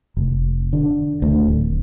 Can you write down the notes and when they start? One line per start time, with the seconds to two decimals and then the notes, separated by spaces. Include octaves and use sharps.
0.17 F1
0.73 D3
1.22 D2
1.48 D1